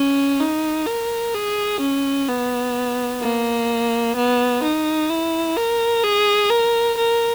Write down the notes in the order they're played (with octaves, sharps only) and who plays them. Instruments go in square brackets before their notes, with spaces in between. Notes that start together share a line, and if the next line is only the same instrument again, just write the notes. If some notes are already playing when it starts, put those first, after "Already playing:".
Already playing: [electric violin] C#4
D#4
A#4
G#4
C#4
B3
A#3
B3
D#4
E4
A#4
G#4
A#4
A#4